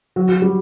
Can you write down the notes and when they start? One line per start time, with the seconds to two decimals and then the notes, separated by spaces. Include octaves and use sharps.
0.16 F#3
0.29 F#3
0.42 G3